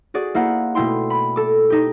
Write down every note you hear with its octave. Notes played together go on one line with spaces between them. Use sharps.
F#4 G#4 D5
A#3 E4 C5 F5 F#5
B2 A3 E4 G5 C6
B5
A4 D6
D#4 G4